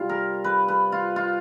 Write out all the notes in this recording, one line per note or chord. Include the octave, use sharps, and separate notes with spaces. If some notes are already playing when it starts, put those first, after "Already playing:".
Already playing: C3 G3 F4
A#4
B4
B4
F4
F4